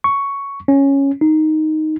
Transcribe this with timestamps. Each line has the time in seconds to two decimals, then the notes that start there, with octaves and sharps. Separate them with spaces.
0.04 C#6
0.68 C#4
1.21 D#4